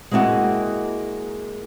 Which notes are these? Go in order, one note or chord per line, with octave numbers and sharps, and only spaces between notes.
G#3 A#3 C4 E4 F#4 D#5